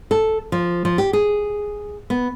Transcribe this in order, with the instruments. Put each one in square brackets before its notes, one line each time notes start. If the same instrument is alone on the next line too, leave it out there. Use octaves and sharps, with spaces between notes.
[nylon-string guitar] A4
F3
F3
G4
G#4
B3